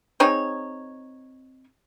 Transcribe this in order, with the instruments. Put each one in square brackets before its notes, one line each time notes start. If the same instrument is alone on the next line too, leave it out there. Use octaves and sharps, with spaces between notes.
[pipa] C4 D#4 G#4 C#5